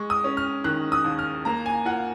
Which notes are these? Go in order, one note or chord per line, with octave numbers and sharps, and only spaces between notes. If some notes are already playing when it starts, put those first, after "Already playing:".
Already playing: G#3 C#6
D#6
C#4
F6
D#3 F#6
D#6
D#2
F6
A#3 A#5
G#5
F4 F#5